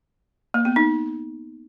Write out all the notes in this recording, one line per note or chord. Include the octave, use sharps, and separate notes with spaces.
A#3
B3
D#4